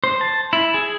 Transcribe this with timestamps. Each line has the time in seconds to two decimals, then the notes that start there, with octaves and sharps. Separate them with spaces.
0.04 C5
0.21 A5
0.53 E4
0.74 G#4